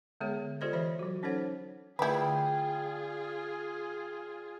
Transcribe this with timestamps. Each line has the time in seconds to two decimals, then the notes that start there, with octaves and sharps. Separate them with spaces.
0.21 D3 G#3 B3 G#4 C#5
0.61 F4 G4 A4 C5 D5 D#5
0.73 E3 C#5 D#5 E5
0.99 F#3 F#4
1.23 C#4 D#4 A4 C5 C#5 F#5
1.99 D3 A3 E4 F4 G#4 B4 D5 G5